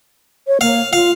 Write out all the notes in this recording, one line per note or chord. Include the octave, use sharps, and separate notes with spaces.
C#5
A#3 F5
F4 F5